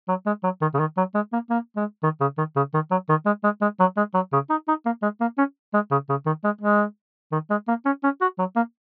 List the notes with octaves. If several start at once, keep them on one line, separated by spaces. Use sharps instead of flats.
F#3
G#3
F#3
D#3
C#3
D#3
F#3
G#3
A#3
A#3
G#3
D#3
C#3
D#3
C#3
D#3
F#3
D#3
G#3
G#3
G#3
F#3
G#3
F#3
C#3
D#4
D#4
A#3
G#3
A#3
C#4
G#3
C#3
C#3
D#3
G#3
G#3
D#3
G#3
A#3
C#4
C#4
F#4
F#3
A#3